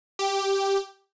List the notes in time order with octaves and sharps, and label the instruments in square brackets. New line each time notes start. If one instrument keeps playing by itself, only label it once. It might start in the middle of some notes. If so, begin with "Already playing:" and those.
[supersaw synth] G4